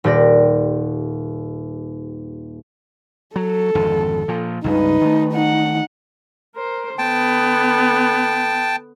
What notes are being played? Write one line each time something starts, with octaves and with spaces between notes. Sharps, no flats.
D#1 G4 D5 A#6
F#3 A4
G#1 F2 D3
A#2 F3
C#2 G2 C#3 D#4 B4
D#3 A3
D#4 F#5
A#4 C5
D3 B3 G5 A5